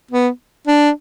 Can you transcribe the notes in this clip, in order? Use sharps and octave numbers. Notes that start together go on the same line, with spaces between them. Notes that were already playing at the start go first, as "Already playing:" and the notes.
B3
D4